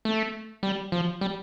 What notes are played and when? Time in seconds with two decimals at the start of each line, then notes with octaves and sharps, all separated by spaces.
0.05 A3
0.63 G3
0.92 F3
1.21 G3